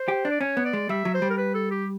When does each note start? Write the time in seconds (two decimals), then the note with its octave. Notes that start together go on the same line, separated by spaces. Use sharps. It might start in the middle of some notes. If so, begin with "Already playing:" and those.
Already playing: C5
0.08 G4
0.25 D4
0.31 D5
0.41 C#4 C#5
0.57 B3
0.65 D5
0.73 G#3
0.89 G3 E5
1.05 F#3
1.14 C5
1.22 G3
1.30 A#4
1.38 B4
1.54 A4
1.71 G4